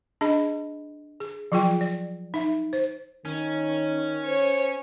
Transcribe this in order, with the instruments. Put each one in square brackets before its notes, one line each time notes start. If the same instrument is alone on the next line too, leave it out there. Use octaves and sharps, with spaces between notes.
[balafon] D4 G#4 D#5 B5
G#4
F3 F#3 F4 G#4 G5
D5
D#4 E5
C5
[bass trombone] D#3 [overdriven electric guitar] C#4
[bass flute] C5 [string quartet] C#5